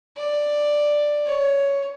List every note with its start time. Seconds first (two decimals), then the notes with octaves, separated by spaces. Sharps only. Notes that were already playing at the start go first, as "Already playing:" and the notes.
0.17 D5
1.26 C#5